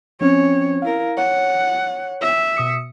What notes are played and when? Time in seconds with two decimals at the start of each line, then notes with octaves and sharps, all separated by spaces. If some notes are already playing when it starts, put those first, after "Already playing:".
0.21 F3 C4 C#4 C#5
0.82 E4 A#4 F5
1.17 C#5 F#5
2.21 E5
2.57 B2 D#6 C#7